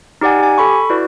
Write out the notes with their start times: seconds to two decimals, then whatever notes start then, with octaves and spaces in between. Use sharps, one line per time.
0.21 D#4 G4 D5 F#5 G#5
0.39 G4 G#5
0.58 A4 B5 C#6
0.90 E4 F#4 B4 D5